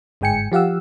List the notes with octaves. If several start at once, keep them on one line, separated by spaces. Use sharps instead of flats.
G1 G#2 G#3 G5 G#5 C#7
F3 G4 F5 F#5 E6